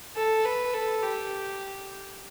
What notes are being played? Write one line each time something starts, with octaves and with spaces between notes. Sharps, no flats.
A4
B4
A4
G4